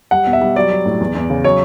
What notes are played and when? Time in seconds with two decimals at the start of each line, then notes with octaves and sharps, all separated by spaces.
0.11 G3 F#5
0.27 B2
0.33 E5
0.41 G3
0.56 F#3 D5
0.71 F#3
0.86 A2
1.00 E2
1.15 E2
1.30 C#3
1.44 F#3 C#5